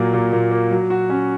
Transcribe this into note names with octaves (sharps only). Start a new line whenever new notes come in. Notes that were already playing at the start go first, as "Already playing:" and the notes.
Already playing: A#2 F#3 A#3
A#2
A#2
A#3
F#3
F#4
C#4